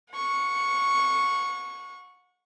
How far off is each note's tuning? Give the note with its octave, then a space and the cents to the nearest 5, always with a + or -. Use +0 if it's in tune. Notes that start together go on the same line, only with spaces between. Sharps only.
F#5 -35 C#6 +0